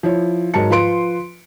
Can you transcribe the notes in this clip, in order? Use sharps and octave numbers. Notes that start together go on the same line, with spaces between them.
F3 E4 C#5
G#2 F#3 A#4 A5 C#7
F3 F4 B4 C6 D7